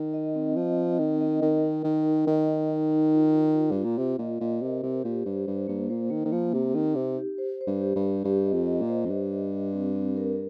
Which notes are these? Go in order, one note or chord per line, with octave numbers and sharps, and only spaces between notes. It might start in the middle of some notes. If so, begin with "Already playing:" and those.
Already playing: D#3
D#5
C4
F3 D#5
C4
D#3 C4
D#5
D#3 A#4
D#4
D#3 A#4
D#4
D#3 D#5
D#4
D#4
D#4
F4
F4
F4
G2
F4
A#2
C3 F4
A#2 D#5
A#2 D#5
C3 A#4
C3 C5
A#2 G4
G2 C5
G2 C5
G2 A#3
A#2 C5
D#3 A#3
D#3
F3 A#3
C3 G4
D#3 C4
C3 D#4
G4
C5
C5
G2
G4
G2
G4
G2 G4
D#5
F2
D#5
A#2
C5
F2
G2 G4
D#5
G4
C4
C4
A#4